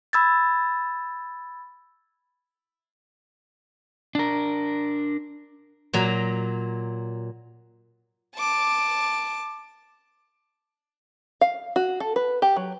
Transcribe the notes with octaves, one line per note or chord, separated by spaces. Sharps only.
B5 E6 G#6 A6
D4 A#4
A#2 F#3 A#5
A5 D6
F5
F#4
A4
B4
G4
F#3